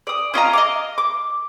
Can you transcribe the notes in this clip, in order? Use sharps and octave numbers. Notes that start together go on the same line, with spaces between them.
D5 D#6
C#4 F4 D#5 A#5
D#5 F5 D6
D6